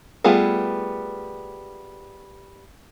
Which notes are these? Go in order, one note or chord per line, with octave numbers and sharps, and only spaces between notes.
G3 A3 B3 F4 G#4